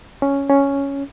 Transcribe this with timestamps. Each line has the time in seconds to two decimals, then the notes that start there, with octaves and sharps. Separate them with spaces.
0.22 C#4
0.50 C#4